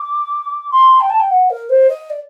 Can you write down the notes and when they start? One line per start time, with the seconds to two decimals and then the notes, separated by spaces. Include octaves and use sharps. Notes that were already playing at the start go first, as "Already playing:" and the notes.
Already playing: D6
0.71 C6
1.01 G5
1.10 A5
1.20 G5
1.30 F#5
1.50 A#4
1.69 C5
1.89 D#5
2.10 D5